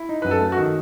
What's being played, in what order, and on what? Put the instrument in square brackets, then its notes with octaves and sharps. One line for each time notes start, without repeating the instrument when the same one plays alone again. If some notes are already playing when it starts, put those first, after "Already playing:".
Already playing: [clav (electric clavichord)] E4
D#4
[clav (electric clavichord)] F#2 [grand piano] B4
[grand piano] A4
[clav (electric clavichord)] A3
[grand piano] F#4
[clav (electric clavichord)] D#3